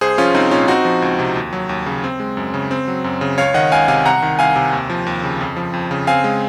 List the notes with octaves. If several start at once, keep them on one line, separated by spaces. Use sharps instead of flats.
C2 G#4 C5
F3 C#4 F4
C2 C4 D#4
A#2 C#4 F4
C4 D#4 F#4
F3
C#2
C3
D#2
F#3
D#2
C#3
C4
G#3
F#2
C#3
C4
F#3
F#2
C#3
C#2 C#5 F5
D#3 D#5 F#5
C#2 F5 G#5
C3 F5 G#5
C2 F#5 A#5
D#3
C2 F5 G#5
C3
D#2
F3
D#2
C#3
F2
F3
F2
C#3
C4 F5 G#5
G#3